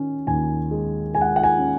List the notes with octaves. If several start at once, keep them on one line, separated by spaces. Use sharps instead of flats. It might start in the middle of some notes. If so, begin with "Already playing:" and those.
Already playing: D#3 C#4
D#2 G#5
G#3
G#3 G#5
F#5
F#5
G#5
C#4